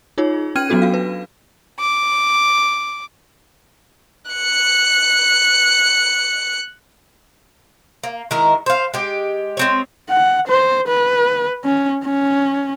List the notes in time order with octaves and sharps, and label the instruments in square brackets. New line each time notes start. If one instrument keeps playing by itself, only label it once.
[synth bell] D#4 F4 G#4 C#5
C#4 G5 F6 G#6 D#7
F#3 B3 D4 F#4 A4 D#7
F#4 F5
B4
[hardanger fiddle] D6
[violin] F#6 C#7
[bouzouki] A#3
D#3 G#3 E4 A#4
C5 F5
G#3 G4
G#3 C4 C#5
[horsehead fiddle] F#5
C5
B4
C#4
C#4